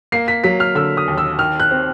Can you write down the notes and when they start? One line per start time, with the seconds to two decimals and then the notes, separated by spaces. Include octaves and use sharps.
0.12 A#3 C7
0.28 B6
0.44 F#3 B6
0.60 F6
0.75 D3 E6
0.97 D#6
1.08 D#2
1.18 E6
1.39 D#3 F6
1.60 F#6
1.71 C4